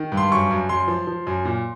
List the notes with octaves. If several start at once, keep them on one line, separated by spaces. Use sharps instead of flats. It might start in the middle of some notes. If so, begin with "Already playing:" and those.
Already playing: D#3
G2
C6
F#2 C#6
F#2
F#2 C6
F3
F3
F#2
A#2